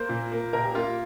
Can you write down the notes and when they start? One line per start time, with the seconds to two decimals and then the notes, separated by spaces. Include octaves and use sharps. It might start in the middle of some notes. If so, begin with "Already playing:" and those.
Already playing: A#3 C5
0.09 A#2
0.32 A#3
0.53 A#2 A#4
0.65 G4
0.75 A#3 F4